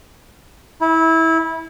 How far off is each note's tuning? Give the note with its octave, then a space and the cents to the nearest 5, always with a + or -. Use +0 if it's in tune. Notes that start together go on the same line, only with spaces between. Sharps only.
E4 -20